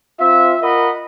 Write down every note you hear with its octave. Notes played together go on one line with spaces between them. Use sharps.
C4 F4 E5
F4 A#4 D#5 F#5 B5